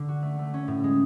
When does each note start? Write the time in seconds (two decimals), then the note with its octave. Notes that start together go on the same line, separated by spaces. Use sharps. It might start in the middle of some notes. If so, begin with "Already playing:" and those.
Already playing: D3
0.08 F#4
0.23 A3
0.39 A3
0.54 C#4
0.68 A2
0.84 G#3